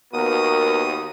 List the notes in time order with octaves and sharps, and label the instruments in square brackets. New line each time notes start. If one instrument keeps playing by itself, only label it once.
[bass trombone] D#2 [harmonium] B3 F#4 [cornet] A#4 [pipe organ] D#6